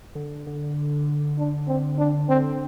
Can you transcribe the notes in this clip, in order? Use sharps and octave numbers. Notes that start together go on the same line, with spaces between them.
D3
D3
D4
C4
D4
D3 C4